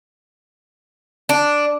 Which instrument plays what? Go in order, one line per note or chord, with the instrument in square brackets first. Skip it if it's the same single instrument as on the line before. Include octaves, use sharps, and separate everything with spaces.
[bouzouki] D4